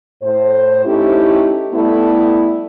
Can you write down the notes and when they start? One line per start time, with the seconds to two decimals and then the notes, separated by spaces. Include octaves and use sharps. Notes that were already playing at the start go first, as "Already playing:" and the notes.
0.23 A2 C5
0.86 A3 C#4 D#4 E4 G4
1.73 G3 A3 B3 E4